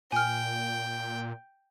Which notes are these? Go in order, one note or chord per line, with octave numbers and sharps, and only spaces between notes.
A#2 G5 G#5 F6